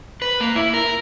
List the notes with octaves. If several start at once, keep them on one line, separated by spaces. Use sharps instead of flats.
B4
A#3
E4
A#4